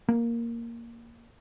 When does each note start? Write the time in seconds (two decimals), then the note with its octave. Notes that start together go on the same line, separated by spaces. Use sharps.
0.09 A#3